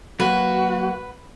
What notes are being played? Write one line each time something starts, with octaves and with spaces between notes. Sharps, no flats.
F#3 A#3 F#4 B4